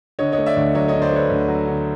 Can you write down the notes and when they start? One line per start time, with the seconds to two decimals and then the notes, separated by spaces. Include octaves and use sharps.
0.19 D3 C#5 D#5
0.32 C#5 D#5
0.38 A3
0.46 D5 E5
0.57 D2
0.75 F#3 C#5 D#5
0.88 D3 C#5 D#5
1.02 C5 D5
1.12 A3 B4 C#5
1.30 D2
1.48 F#3
1.68 D3